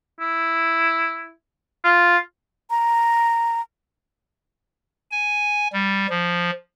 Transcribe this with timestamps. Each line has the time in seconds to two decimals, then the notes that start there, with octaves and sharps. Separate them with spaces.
0.20 E4
1.84 F4
2.70 A#5
5.11 G#5
5.73 G3
6.10 F3